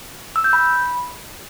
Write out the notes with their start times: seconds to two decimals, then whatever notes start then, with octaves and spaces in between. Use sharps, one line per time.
0.36 E6
0.44 G6
0.53 B5